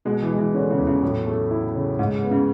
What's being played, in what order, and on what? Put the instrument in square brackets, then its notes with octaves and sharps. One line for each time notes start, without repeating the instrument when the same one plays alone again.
[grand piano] B2 [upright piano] G#3
[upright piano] E3
[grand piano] G#3
[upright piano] E3
[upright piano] D3 [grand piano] C#4
[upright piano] C#3
[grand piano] E2
[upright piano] C#3
[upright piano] A2 [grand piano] F#3
[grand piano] A3
E4
C#3
[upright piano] G#2 [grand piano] G#3
[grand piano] B3
[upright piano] C#3